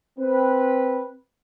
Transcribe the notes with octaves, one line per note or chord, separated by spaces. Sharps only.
C4 B4